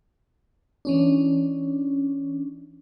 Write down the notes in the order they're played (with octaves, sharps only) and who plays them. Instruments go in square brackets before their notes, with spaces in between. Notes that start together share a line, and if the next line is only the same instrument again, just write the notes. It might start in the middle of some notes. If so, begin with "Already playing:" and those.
[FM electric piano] E3 C#4 D4